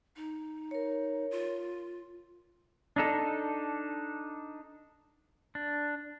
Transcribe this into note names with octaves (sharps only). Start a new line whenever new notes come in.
D#4
A#4 C#5
F4
D4 D#4 A4
D4